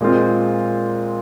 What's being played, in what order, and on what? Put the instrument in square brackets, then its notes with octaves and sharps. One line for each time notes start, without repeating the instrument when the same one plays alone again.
[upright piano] A#2 G#3 C4 F4